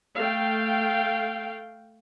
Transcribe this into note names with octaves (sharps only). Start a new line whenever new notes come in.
A3 F5 G5